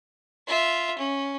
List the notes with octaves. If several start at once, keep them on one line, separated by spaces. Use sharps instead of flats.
F4 E5
C#4